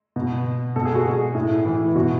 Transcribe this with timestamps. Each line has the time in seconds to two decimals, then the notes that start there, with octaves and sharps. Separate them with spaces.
0.16 B2
0.76 B2 A4
0.85 G#4
0.95 F#4
1.06 G#4
1.35 A2
1.65 E3
1.96 B2 F#4